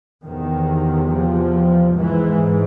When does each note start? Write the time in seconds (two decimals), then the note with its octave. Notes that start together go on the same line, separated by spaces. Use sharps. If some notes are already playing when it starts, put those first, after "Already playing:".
0.23 E2 C3 D#3
1.09 F3
1.95 G#2 E3